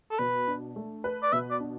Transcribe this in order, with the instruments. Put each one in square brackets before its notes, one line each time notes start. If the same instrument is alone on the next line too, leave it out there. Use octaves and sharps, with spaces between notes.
[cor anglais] A4
[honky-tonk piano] B2 [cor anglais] B4
[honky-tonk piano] D4
A3
B4
[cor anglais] D5
[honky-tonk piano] B2 [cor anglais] E5
[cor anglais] D5
[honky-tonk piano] D4